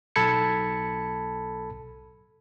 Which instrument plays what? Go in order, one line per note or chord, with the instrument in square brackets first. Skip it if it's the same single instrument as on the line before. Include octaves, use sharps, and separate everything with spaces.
[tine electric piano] B1 A4 A5 B5 G#6 C#7